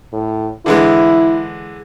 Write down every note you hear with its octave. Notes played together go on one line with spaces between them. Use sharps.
A2
D3 E3 G#3 E4